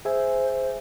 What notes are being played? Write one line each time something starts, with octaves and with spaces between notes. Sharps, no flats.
G#4 C5 E5 G#5